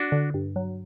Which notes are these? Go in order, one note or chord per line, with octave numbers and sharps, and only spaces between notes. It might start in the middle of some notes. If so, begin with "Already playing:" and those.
Already playing: D4 F#4
D3
G2
F#3